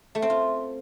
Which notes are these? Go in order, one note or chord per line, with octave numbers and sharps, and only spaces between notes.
A3
C4
F4